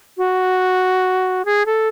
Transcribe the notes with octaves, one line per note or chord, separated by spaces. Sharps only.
F#4
G#4
A4